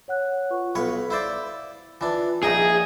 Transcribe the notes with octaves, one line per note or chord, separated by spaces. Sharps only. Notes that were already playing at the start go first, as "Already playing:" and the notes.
C#5 F#5 F#6
F4 B4 C#6
B1 B4 C#5 F5
E4 C5 D5
E3 D4 F4
A#1 D#4 G#4 D#5 E5 G5 G#5